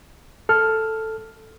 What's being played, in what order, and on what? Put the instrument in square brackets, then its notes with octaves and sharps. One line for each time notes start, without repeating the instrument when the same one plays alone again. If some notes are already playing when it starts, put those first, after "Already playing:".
[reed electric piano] A4 F6